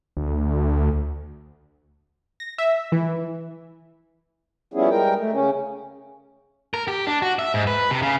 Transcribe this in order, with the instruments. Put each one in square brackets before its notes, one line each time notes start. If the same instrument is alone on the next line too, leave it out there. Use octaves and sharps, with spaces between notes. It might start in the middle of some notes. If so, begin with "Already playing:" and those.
[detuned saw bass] D2
[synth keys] A#6
E5
E3
[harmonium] F3 G3 B3 C#4 E4 G#4
G3 G#3 A#4 G5
A3
C#3 C#4
[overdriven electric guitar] A#4
G4
D4
F#4
E5
G#2
B4
C3
C#3